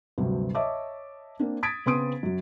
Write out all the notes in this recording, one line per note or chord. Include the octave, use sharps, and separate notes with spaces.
D2 G2 C3 F#3
C#5 D#5 E5 A5 D6
A#3 C4 D4
D#6 G#6 A6 B6 D7
C#3 B3 C4 C6 D#6 D7
F#2 F#3